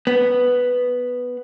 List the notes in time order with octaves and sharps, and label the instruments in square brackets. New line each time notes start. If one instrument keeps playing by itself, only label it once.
[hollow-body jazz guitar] B3